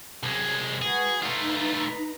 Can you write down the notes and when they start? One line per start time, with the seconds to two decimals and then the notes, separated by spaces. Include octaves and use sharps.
0.23 C2 F#3 G#3
0.82 G#3 F#4 G#4 B4
1.22 A3 D#4 F4 B4 A#5